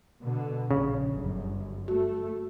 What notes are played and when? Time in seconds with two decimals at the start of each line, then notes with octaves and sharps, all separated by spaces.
0.21 B2 D3
0.71 A#1 C#3
1.11 G1 F#2
1.88 A3 F#4